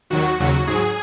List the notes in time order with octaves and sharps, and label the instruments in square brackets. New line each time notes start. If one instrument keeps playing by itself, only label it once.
[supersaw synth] D#2 D#3 F#3 F#4
D#2 C#3 F#3
G#2 F#3 G#4